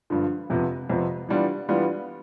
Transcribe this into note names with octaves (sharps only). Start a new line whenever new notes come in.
G2 D3 F3
F2 C3 F3 B3
F2 C3 F3 B3
E3 G3 B3 D4 F4
E3 G3 B3 D4 F4